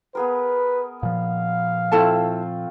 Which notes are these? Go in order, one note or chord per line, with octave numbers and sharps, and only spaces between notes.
B3 G#4 A#4 B4
A#2 F3 F5
A3 C4 E4 F4 A4 A5